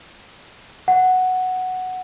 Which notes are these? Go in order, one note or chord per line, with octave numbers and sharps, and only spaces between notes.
F#5